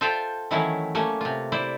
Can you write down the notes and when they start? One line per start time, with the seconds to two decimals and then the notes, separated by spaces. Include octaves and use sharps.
0.01 F4 A4 C5 E5 F5 G5
0.51 D#3 E3 F#3 A3 C#4 E4
0.95 A3 A#3 C#4
1.21 C3 F4
1.52 E4 C5 D5